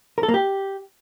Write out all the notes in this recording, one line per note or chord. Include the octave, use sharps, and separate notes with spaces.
A#4
A4
A#3
G4